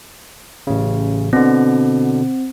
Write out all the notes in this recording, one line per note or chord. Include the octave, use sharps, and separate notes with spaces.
A1 C#3
B2 D3 C4